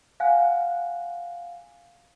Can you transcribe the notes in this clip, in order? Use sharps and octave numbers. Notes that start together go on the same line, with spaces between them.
F5 F#5 G#5 F#6